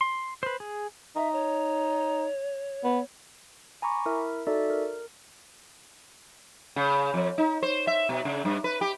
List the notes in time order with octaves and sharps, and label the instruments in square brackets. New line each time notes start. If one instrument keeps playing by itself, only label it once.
[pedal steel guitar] C6
B4 C5
G#4
[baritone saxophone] D#4 [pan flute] E5
[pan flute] C#5
[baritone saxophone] B3
[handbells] G#5 A#5 B5 C#6 D6
E4 A#4 E5
D#4 F#4 A4 D5 E5
A#4
[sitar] C#3
F2
D#4
C5
E5
B2
C#3
G2
B4
G4